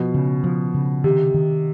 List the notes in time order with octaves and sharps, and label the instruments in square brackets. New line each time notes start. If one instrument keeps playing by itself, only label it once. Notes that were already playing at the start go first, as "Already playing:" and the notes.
Already playing: [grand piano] B2 [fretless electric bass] F3
[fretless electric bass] C#3
F3
C#3
[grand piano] C3 [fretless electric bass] D#3
[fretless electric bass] D#3